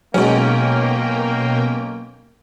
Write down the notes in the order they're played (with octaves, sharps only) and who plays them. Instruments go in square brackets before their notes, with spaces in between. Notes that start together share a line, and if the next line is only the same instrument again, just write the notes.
[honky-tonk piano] B1 C#4 [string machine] B2 A#4 G5 [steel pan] F#3 G#3 [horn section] A#3